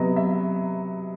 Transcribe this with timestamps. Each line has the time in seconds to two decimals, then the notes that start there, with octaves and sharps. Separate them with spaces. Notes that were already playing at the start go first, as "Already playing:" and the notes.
Already playing: C3 F#3 B3 D#4 D#5
0.16 E5